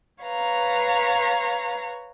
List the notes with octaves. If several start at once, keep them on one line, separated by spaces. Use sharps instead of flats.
B4 C#5 F5 A#5